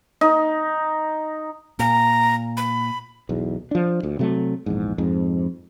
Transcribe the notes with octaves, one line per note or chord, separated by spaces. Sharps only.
D#4
A#2 A#5
B5
B1 E2
F3 D4
D2
C3 F#3 A3
A#1 E2 G#2
F2 G#2